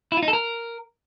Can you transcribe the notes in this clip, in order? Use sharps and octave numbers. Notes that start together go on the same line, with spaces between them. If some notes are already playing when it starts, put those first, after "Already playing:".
E4
F4
D#4
A4
A#4